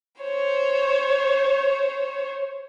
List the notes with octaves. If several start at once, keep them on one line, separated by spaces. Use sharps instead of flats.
C5 C#5